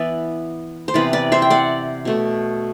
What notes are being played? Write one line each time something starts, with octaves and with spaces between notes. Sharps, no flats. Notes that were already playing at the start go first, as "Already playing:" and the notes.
Already playing: E3 B3 B4 D5 E5
C5
C3 E3 B3 B4 D5
B4 D5
C5 E5
G5
D5 F#5
B2 A3